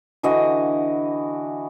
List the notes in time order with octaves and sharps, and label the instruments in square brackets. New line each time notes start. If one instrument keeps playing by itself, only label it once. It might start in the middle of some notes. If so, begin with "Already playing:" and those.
[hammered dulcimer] D3 E3 F#4 D#5